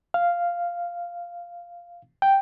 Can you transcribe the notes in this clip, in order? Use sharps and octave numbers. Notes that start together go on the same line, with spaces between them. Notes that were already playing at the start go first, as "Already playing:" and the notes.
F5
G5